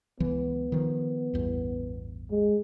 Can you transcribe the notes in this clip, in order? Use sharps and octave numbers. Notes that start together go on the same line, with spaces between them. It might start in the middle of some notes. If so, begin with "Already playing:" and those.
C#2 E3 F#3 B3
D#3 F3
A1 E2 G2
G#3